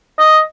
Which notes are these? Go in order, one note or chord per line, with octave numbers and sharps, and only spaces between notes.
D#5